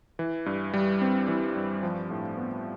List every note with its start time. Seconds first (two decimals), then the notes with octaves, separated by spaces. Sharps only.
0.19 E3
0.46 G2
0.74 G3
1.01 C4
1.28 E3
1.55 G2
1.83 F3
2.11 A2
2.38 B3